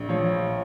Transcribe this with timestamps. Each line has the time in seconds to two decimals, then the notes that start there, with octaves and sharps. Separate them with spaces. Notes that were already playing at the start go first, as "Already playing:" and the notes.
Already playing: A#1
0.09 F3 C#5